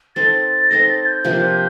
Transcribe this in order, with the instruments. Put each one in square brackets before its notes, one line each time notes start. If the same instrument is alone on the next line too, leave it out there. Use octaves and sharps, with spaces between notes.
[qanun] C4 D#4 A4 C5 [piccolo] A6
[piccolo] A6
A6
[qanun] C4 D#4 A4 C5 [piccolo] A#6
[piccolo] A6
G6
[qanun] C3 F3 A#3 D4